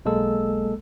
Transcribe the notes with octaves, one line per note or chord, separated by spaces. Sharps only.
B1 G#3 A#3 A4 E6